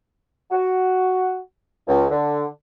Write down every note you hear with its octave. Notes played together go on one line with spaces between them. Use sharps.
F#4
C#2
D3